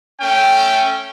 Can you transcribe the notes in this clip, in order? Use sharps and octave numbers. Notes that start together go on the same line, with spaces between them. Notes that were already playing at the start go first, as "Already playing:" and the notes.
A3 C#4 G5